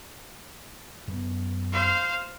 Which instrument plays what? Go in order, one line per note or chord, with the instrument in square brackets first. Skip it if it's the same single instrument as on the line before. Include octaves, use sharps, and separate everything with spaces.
[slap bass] F#2 B3
[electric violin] C5 F5